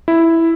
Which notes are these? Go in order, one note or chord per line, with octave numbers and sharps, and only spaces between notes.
E4